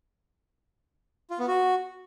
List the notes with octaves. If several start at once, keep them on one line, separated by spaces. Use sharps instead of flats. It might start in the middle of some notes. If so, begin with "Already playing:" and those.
F4
B3
F#4